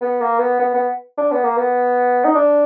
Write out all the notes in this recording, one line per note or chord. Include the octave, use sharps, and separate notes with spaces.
B3
A#3
B3
B3
B3
D4
B3
A#3
B3
D#4
D4